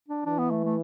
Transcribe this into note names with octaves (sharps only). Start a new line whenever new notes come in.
D4
E3 D4
B3
A3
A3